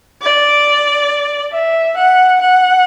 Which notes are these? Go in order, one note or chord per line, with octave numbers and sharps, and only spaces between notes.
D5
E5
F#5
F#5